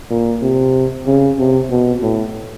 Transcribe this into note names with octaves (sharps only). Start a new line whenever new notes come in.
A#2
C3
C#3
C3
B2
A2